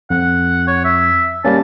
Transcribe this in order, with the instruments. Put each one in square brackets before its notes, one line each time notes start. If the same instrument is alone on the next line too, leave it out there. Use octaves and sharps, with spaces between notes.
[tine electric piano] F2 [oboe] F#5
[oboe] C#5
E5
[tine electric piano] G3 A#3 C#4 [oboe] A5